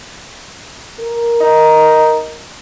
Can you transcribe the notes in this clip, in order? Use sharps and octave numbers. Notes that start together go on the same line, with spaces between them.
A#4
D#4